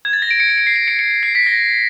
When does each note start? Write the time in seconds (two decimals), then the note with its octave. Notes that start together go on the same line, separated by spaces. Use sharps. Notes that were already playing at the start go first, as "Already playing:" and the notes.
0.05 G#6
0.13 A6
0.22 A#6
0.31 D7
0.40 C#7
0.50 D7
0.58 C#7
0.67 C7
0.76 D7
0.88 C#7
0.99 C#7
1.11 C#7
1.23 C7
1.35 B6
1.46 A#6